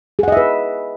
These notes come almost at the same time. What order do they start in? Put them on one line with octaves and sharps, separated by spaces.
G#4 F#5 D#5 E5 B4